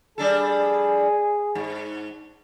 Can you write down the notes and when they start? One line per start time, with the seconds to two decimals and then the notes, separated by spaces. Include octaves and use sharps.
0.18 G3 D4 G#4 A4
1.55 G#2